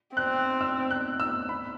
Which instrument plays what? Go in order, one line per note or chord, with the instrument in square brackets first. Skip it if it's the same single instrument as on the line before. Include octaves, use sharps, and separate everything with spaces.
[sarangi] C4 [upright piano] F#6
[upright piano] E6
F#6
E6
B5